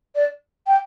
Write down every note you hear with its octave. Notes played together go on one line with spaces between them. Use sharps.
D5
G5